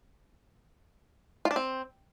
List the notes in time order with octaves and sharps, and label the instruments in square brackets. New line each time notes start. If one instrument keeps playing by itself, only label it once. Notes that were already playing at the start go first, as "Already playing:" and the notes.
[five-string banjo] F4
D4
C4